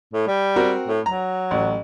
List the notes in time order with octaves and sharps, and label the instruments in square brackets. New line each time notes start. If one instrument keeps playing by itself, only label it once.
[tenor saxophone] A2
G3
[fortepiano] C4 F#4 A#4
[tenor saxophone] A2
[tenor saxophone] F#3 [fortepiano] A#5
[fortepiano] A1